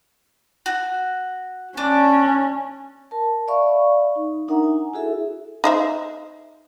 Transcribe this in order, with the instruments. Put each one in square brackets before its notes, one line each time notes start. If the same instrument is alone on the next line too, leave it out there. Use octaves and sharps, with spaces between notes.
[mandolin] F#4
[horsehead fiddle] C#4 [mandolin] D4
[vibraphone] A#4 A5
D5 E5 F5 B5 C#6
D#4
D4 D#4 A#4 E5 F#5 A#5
G#5
E4 F#4 G#4 A4 E5
[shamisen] D#4 C5 E5